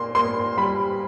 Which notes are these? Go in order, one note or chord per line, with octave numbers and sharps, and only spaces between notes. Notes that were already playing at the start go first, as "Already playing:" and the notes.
Already playing: A#2 A#3 C6
A#3 C6
G3 B5